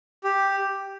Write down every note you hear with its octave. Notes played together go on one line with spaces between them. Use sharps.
G4